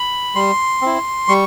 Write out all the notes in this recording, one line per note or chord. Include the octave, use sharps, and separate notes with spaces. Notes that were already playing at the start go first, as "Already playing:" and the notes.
Already playing: B5
G3 C6
C4 E4
G3 C#6